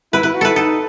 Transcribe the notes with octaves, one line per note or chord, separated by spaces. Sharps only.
E4 B4
E4 B4
F#4
E4 A4 B4
D#4 A4